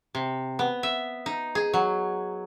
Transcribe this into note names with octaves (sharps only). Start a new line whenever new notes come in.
C3
B3
E5
D#4
G#4
F#3